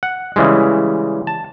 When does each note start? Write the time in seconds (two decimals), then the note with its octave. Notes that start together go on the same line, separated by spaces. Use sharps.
0.03 F#5
0.36 C#3 E3 G3 G#3
1.27 A5